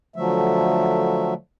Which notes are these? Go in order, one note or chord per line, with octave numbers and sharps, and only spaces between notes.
D3 F3 F#3 A3 E5